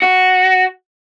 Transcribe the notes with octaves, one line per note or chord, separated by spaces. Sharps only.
F#4